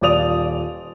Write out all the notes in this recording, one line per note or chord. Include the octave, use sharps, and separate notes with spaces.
D#1 F4 D5 D#6 F7